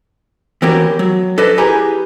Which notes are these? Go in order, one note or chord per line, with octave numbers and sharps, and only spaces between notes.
E3 B3 F#4 G4 A#4 C#5
F#3
A4 B4 D5 D#5
E4 G4 G#4 B4 G#5 A#5